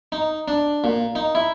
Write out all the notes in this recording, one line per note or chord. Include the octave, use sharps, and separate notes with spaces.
D#4
D4
A#2
D#4
E4